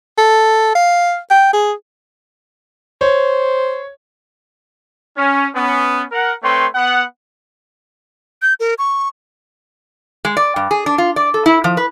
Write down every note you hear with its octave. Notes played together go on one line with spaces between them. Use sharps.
A4
F5
G5
G#4
C5 C#5
C#4
B3 C#4
A#4 F#5
A3 C4 B4 C#5 G5 C6
B3 F#5
G6
A#4
C#6
G#3
D5
G2
G#4
D4
F4
D5
A4
E4
F3
B4